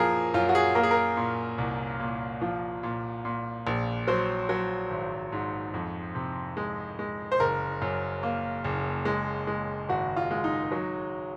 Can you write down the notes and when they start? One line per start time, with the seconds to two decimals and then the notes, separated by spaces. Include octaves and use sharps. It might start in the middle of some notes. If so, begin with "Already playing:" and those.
Already playing: F#2 F3 A#3 G#4 A#4
0.34 F#2 F4
0.49 F#4
0.55 G#4
0.75 A#3 A#4
0.83 G#4
0.91 A#4
1.17 A#2
1.58 C2
2.00 A#2
2.41 F3
2.83 A#2
3.25 A#2
3.67 A#1
4.07 F#3 C5
4.49 F#3
4.90 G#1
5.32 G#2
5.74 F2
6.15 C3
6.57 G#3
6.99 G#3
7.32 C5
7.40 F#1 A#4
7.82 F#2
8.23 A#3
8.64 F#1
9.05 G#3
9.47 G#3
9.89 G#1 F#4
10.17 F4
10.31 G#3
10.44 D#4
10.72 F#3